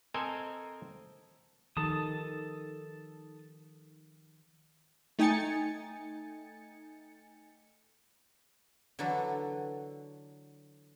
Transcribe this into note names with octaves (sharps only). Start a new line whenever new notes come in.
C4 A4 A#4 C5 D#5 G#5
D#3 F3 G4 A4 A5 D#6
A3 D#4 G5 G#5 A6 C#7
D3 E3 F#3 F#4 A4